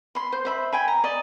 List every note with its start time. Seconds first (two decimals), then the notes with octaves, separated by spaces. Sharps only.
0.15 B5 C6
0.33 C5
0.45 C5 E5 B5
0.73 G5 G#5 B5
0.88 A#5
1.04 D5 D#5